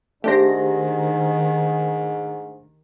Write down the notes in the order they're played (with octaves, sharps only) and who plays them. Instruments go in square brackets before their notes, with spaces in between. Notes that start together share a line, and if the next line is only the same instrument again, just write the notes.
[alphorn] G#2 [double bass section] D#3 [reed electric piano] A3 D4 C5 [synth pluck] G4 A#6